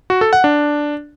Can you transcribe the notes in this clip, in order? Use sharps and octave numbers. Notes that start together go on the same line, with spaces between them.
F#4
A4
F#5
D4